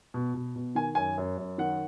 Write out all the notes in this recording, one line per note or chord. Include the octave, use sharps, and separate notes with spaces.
B2
B2
B2
D#3 G#5
F#2 G#5
F#2
F#2
D#3 F#5